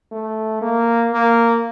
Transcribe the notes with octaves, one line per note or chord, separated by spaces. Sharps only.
A3
A#3
A#3